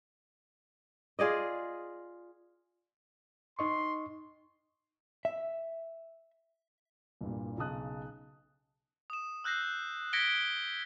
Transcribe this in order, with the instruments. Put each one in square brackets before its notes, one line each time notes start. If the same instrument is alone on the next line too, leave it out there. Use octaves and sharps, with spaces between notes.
[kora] F4 G#4 D5 D#5
[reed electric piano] D#4 D#5 C#6 [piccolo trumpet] C6
[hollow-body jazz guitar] E5
[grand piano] C2 G2 A#2
B1 C#3 D#4 A5 D#6 F#6
[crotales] D#6 E7
E6 F#6 G6 A#6 C7
G#6 A#6 B6 C#7 D7 G7